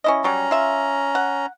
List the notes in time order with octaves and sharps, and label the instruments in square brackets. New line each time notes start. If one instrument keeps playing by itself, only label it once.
[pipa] C#4 E4 D#5
[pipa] F#3 G3 [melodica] C#4 A#5
[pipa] F4 E5
F#5